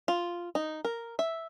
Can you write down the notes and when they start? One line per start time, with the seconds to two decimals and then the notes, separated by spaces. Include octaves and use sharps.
0.08 F4
0.55 D#4
0.85 A#4
1.19 E5